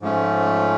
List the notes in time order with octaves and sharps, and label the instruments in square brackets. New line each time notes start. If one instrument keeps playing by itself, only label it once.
[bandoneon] G#2 F3 A3 C#4